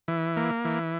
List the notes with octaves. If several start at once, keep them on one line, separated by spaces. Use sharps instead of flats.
E3
A#3
E3